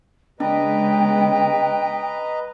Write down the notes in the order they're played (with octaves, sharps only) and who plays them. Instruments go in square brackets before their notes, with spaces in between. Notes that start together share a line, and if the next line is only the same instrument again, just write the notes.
[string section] C#3 G#3 B3 [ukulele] D4 [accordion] B4 D#5 A#5 [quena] G5